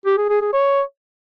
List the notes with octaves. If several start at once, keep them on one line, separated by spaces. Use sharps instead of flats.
G4
G#4
G#4
G#4
C#5